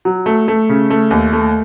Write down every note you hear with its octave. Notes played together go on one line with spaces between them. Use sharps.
F#3
A3
A3
C#3
A3
D#2
A3